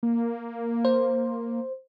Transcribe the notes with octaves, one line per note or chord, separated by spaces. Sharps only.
A#3
C5